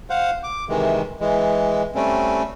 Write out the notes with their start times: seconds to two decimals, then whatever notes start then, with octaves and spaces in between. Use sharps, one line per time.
0.10 C5 F5 F#5
0.43 D6
0.69 C3 D#3 E3 G#3
1.20 E3 G#3
1.95 G3 A3 C4 C#4